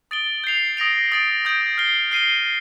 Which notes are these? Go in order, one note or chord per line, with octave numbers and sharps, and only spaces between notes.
D#6 A6 D7 G7
G6 C7 F7
D#6 A#6 D7 F7
D#6 A6 D7
D#6 G6 D7
F6 C7 G7
F6 C7 D#7 G7